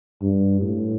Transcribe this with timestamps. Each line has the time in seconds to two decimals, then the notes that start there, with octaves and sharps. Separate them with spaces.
0.22 G2
0.62 A2